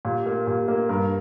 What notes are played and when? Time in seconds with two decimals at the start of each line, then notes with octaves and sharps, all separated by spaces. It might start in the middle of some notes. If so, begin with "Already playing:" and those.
0.05 A#2 G4
0.26 A#3
0.47 A#2 G4
0.68 A#3
0.89 G2 A#4